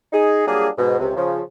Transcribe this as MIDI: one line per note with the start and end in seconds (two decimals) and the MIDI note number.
0.12 0.45 63
0.12 0.45 68
0.47 0.68 54
0.47 0.68 55
0.47 0.68 58
0.47 0.68 62
0.47 0.68 65
0.47 0.68 68
0.78 0.97 44
0.78 0.97 47
0.99 1.16 37
0.99 1.16 48
1.16 1.41 49
1.16 1.41 53